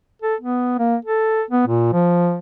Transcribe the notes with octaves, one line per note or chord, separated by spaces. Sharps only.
A4
B3
A#3
A4
B3
A#2
F3